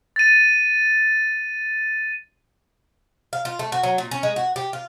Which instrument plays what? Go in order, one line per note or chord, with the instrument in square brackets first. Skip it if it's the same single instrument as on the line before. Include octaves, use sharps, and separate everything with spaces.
[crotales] A6 D#7
[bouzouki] F5
F4
A3
F#4
F#3
A#2
C#4
G#3
F#4
G4
F4